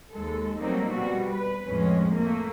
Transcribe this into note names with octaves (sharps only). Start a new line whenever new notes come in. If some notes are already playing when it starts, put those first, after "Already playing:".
D#2 G#3 A4
F#3 G3 A3 A#3 C4 D#4
B2 G3 F#4
B4
F2 A2 G#3 C#4
A3 A#3